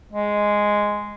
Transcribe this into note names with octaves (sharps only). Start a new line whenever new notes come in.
G#3